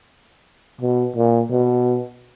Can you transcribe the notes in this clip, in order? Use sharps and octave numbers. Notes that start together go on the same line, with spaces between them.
B2
A#2
B2